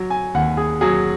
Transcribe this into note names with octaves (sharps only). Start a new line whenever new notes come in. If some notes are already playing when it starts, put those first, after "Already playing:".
Already playing: F#3
G#5
D#2 F#5
G#4
F#3 G#4